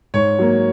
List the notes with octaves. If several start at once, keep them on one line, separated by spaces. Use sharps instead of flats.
G#2 C#5
F#3 A#3